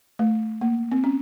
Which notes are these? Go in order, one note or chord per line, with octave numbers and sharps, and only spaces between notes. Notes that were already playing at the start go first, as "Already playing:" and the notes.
A3
A#3
C4
C#4